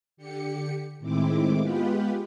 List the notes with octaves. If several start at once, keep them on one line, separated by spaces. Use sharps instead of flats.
D3 G4 C#7
A2 D#3 G#3 C4 E4 D6
G#3 B3 F4 G4 B4